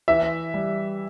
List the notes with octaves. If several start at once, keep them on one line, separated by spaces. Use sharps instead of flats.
E3 E5
G3